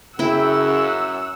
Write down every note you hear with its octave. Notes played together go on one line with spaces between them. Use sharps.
F#2 C#3 E4 F#5 G5 B5 E6